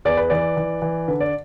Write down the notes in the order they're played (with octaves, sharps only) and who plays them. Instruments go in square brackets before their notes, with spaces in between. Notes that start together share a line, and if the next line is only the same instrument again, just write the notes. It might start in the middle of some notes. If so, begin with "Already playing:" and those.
[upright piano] E2 D5
B4
E3 D5
E3
E3
D3 B4
D5